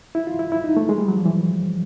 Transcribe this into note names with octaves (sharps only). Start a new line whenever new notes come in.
E4
F4
E4
E4
D#4
A3
G#3
G3
F#3
F3
E3